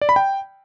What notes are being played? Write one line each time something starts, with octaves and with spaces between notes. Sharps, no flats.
D5
B5
G5